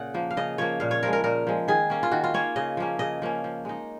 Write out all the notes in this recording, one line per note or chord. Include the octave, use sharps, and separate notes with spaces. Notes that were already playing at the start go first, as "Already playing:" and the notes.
Already playing: A#2 C#3 F#5
F3 A#3
F5
C#3 D#5
F3 A#3 C#5
A#2 F5
C#5
F3 G#3 A#4
A#4
A#2 A#4
F3 G#3
D#3 G#4
A#3 C#4
F4
D#3 F#4
F4
A#3 C#4 C#5
C#3 D#5
F3 A#3 C#4
C#3 D#5
F3 A#3 C#4
F3
G#3 D#4